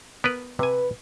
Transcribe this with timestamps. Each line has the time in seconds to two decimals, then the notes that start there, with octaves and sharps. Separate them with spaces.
0.24 B3 A#4 B4
0.59 C3 B4 G#5